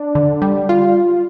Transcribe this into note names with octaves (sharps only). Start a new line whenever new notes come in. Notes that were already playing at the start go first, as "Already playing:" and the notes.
Already playing: D4
D3
G3
F4